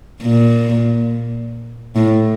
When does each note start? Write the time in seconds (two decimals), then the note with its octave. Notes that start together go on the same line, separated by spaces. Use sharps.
0.23 A#2
1.96 A2